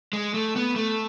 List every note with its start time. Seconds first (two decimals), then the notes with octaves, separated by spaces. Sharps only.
0.13 G#3
0.34 A3
0.56 B3
0.76 A3